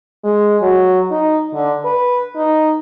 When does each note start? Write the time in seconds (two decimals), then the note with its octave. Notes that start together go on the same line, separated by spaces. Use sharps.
0.24 G#3
0.62 F#3
1.11 D#4
1.54 D3
1.85 B4
2.36 D#4